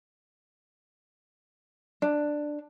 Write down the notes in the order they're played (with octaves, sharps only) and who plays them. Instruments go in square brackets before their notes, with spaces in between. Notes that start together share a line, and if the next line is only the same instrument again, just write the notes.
[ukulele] D4